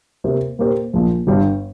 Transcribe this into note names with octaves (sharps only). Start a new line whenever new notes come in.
C3 A#3 G4 C5
A#2 A#3 G4 C5
A#1 A#2 F3
G1 G2 G3